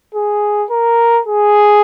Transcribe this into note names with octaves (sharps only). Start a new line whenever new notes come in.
G#4
A#4
G#4